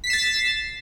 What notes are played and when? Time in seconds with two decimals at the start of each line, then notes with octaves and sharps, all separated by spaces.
0.04 B6
0.07 C7
0.10 E7
0.13 A6